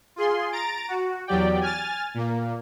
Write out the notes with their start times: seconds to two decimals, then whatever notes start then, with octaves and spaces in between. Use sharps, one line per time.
0.16 F4 G#4 C6
0.52 A#5 A6 D7
0.88 F#4
1.27 E2 F#3 G4 D5 G5
1.61 G#5 F6 A6
2.14 A#2 A#3